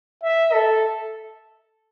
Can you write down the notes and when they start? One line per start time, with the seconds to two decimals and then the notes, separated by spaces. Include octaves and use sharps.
0.23 E5
0.53 A4